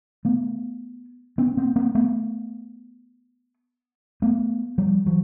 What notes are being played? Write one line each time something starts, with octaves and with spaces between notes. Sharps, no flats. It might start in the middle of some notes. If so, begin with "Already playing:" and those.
A3 B3
B3 C#4
A#3 C4
A#3 C4
A3 B3
A3 B3
F3 G3
E3 F#3